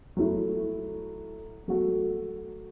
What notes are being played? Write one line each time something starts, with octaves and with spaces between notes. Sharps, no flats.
F#3 A3 E4
F#3 A3 F#4 A4